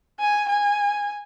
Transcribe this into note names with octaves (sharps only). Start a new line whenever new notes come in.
G#5
G#5